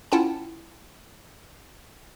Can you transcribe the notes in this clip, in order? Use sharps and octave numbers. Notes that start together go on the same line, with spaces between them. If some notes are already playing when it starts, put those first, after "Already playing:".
C#4 E4 F4 F#5 G5 A5